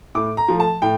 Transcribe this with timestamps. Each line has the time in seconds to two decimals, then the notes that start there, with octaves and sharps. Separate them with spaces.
0.15 A2 D6
0.37 A#5
0.48 F3 A3
0.60 A5
0.82 A2 G5